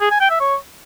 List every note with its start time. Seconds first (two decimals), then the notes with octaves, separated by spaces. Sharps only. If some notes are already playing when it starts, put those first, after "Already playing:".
0.01 G#4
0.11 G#5
0.20 G5
0.30 E5
0.40 C#5